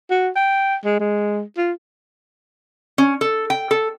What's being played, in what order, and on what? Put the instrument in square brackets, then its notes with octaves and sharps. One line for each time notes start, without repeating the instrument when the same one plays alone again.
[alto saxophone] F#4
G5
G#3
G#3
F4
[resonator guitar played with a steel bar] C#4
A4
G5
A4